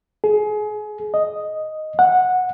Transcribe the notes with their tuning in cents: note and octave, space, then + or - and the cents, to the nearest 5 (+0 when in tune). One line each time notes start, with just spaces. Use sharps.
G#4 +30
D#5 +0
F#5 -15